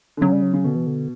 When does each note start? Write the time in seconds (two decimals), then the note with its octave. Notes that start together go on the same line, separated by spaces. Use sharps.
0.17 D3
0.21 C#3 F#3
0.32 G3
0.42 F#3
0.53 C#3
0.64 B2 D3
0.75 E3
0.87 D3